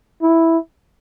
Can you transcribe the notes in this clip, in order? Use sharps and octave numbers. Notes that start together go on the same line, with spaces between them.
E4